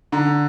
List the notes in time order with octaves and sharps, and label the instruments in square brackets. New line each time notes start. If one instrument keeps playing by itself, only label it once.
[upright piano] D3 A#5